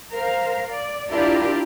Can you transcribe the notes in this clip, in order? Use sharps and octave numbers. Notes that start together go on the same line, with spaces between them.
A#4 C5 F5
D5
D4 E4 F4 G4 A#4 D5